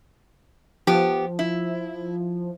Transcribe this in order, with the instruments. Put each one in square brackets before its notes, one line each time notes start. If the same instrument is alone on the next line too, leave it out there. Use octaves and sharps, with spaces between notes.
[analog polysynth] F3 [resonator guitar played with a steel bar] B3 G4
[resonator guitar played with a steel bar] E4